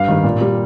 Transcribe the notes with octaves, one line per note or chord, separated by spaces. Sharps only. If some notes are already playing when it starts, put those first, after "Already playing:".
Already playing: G2 F5
D#3 G3
A#2
G3